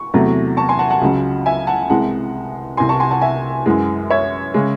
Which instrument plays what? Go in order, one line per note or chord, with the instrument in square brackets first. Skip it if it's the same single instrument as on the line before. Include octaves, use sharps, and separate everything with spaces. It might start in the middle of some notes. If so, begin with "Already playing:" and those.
Already playing: [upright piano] C#6
E2 C3 F#3 A3
A5 C#6
G#5 C6
F#5 A5
F#5 A5
C#2 C#3 F#3
E5 G#5
F#5 A5
C2 C3 E3 G#3 F#5 A5
C2 C3 E3 G#5 C6
A5 C#6
G#5 C6
F#5 A5
E5 G#5
F#2 E3 G#3
C#5 E5
C#3 G#3